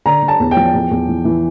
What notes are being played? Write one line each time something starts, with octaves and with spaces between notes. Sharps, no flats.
D3 A#5
D3
A5
E2
G5
F3
E2
E2
E3
E3